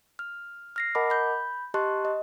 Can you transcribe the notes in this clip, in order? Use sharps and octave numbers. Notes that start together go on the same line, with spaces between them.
F6
F6 A#6 C7
A#4 D#5 F#5 A5 B5 D6
B5 G6
G4 D#5 A5 C6 C#6 F#6
D#5